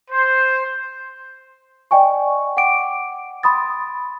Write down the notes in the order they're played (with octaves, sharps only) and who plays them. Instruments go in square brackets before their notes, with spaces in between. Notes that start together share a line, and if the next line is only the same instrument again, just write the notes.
[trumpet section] C5
[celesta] D5 D#5 G5 G#5 C#6
F#5 G5 D6 D7
B5 C6 D#6 A6